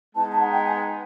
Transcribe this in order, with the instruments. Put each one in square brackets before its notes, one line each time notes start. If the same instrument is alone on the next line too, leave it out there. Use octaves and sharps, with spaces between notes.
[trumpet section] G#3 B3 D#4 [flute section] A5
[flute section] A5
F#5
G5
G#5